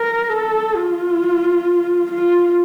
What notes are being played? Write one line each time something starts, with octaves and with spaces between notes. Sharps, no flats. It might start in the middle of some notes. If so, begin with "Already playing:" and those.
Already playing: A#4
A4
F4
F4